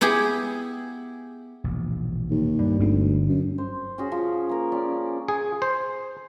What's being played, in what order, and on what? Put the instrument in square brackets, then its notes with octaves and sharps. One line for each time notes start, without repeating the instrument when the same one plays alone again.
[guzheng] B3 E4 G4 G#4
[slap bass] E1 A#1
[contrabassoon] D#2
[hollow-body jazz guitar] G2
[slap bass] G1 C4 [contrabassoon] D2
[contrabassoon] F#2
[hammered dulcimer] C5
C#4 F#4 G#4
F3
A#3 A#4
C#4 D5
[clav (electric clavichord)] G#4
C5